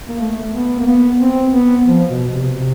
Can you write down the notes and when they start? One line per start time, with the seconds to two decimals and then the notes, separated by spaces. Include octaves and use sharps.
0.08 A#3
0.19 A3
0.52 B3
0.80 A#3
0.86 B3
1.21 C4
1.53 B3
1.86 F3
2.09 B2
2.32 C3
2.54 C3